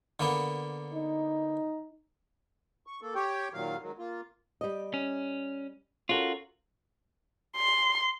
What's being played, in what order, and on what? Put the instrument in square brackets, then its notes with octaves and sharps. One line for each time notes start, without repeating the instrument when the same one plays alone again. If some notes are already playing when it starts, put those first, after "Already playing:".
[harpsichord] D3 A#3 B3
[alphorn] D#4
[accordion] C#6
A#3 A4
G4 C#5 G5
D#2 A#2 D#3 F#3 F5
G#2 D#3 F#3
A#3 F4
[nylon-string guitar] G3 D#5
[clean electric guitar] C#4
[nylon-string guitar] C#4 A4 A#4 [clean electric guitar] F4 F#4
[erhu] C6